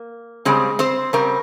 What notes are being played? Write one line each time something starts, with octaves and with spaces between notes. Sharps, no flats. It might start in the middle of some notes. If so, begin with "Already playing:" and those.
Already playing: A#3
C#3 G3 G#3 C4 G#4
C4 C5
C#3 G3 C4 A#4